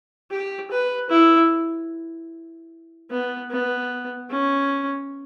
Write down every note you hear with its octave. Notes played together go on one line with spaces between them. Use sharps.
G4
B4
E4
B3
B3
C#4